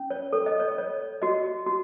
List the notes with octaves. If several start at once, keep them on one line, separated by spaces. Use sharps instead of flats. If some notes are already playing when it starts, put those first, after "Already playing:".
Already playing: C#4
C#5
A4 C#5
D#5
C#5
C#5
F#4 D#5
F#4